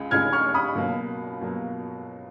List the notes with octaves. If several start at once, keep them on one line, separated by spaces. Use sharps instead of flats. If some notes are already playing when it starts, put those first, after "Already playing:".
Already playing: C#2 C#3 G#3
C#2 C#3 G#3 D#4 F6 G#6
C#6 F6
B5 D#6
C#2 B2 F#3 A#3
B2 F#3 A#3